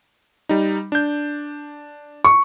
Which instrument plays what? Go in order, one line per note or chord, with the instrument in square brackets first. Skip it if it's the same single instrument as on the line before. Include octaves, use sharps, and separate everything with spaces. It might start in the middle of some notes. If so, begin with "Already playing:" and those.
[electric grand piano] G3 D#4
D4 G6
[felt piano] C#6